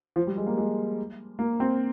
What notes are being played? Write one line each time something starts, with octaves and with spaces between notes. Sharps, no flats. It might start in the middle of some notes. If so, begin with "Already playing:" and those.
F3
G3
G#3
A#3
G#3
A#3
C4